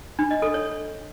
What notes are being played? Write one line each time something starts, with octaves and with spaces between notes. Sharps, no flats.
D4
D#5
A4
C#5